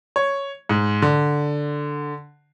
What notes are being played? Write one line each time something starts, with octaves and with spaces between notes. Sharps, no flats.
C#5
G#2
D3